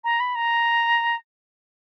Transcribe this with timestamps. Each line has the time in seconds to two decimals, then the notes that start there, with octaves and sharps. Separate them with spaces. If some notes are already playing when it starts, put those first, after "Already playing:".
0.04 A#5
0.20 B5
0.35 A#5